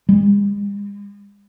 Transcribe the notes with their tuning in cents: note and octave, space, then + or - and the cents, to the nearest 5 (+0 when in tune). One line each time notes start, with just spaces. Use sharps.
G#3 -45